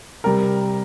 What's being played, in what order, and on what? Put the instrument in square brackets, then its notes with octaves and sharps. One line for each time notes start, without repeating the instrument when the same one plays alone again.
[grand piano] C3 G3 A#4